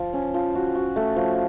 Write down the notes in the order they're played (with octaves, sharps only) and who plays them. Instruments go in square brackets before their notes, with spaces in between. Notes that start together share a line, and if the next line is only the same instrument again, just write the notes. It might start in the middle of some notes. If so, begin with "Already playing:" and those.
Already playing: [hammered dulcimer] F3
C#4
F3
F#4
F#4
A3
F3